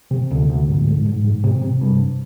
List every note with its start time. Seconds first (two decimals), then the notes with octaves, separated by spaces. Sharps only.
0.11 C3
0.31 D2
0.49 D2
0.68 G#2
0.87 G#2
1.06 G#2
1.24 G#2
1.44 C3
1.62 C3
1.81 G2